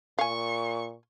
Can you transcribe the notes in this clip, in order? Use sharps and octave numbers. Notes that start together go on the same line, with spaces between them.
A#2 F5 G#5 C#6